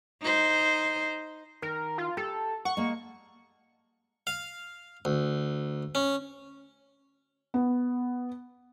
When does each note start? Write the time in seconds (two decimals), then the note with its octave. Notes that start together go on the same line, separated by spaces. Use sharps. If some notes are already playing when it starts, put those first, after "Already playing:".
0.22 D#4 C5
1.62 D#3 A#4
1.98 F4
2.17 G4 A4
2.65 F#5 C#6
2.77 G#3 A#3
4.27 F5
5.05 D2
5.95 C#4
7.54 B3